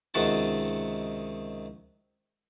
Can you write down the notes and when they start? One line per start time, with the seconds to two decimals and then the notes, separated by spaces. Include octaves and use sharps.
0.14 C#2 C3 D#3 F#4 F#5 A5